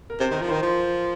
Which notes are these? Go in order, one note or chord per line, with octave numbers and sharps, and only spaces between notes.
A#4
C3 C5
D#3
A#4
F3
D#3 C5
F3